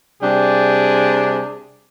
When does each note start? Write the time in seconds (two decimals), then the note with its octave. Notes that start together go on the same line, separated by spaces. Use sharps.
0.22 C3 G3 D4 G#4 D5